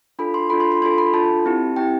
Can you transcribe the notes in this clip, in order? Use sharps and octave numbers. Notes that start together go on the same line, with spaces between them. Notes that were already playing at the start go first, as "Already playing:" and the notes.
D4 F4 A4 B5
C6
D4 F4 A4 B5
C6
B5
D4 F4 A4 C6
B5
D4 F4 A4 A5
C4 E4 G4
C4 E4 G4 G5